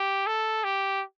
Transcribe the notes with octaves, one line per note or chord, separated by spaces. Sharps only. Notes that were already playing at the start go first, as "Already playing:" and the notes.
Already playing: G4
A4
G4